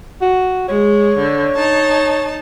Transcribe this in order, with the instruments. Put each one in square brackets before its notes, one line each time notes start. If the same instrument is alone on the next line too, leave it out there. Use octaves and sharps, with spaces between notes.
[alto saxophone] F#4
[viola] G#3 [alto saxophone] C#5
[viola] D3
D#4 A5